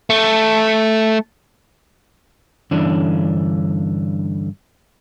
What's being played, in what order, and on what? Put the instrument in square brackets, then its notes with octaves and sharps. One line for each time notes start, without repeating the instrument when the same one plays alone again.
[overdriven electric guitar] A3
[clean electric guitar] G2 D3 E3 C#4 D4